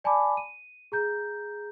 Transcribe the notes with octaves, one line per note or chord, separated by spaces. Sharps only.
D5 G#5 A5 B5 D6
D#7
G#4 A#5 G6